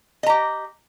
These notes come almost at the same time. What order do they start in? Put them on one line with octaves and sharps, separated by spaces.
D#5 A#5 G4